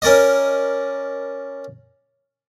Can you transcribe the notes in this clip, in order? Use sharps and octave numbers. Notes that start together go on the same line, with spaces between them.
C#4 A#4 D5 D#5